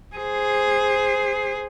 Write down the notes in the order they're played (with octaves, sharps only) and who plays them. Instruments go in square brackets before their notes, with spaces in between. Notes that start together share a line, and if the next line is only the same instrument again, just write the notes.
[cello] G#4 C5